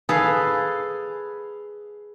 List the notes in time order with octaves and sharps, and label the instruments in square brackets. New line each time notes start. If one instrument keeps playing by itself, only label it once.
[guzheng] G#4 A4 B4 F5